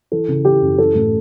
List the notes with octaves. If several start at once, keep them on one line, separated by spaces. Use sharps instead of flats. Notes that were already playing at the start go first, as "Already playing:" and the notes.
E3 A4
C#3
E3 G4
F#2
E3 A4
A2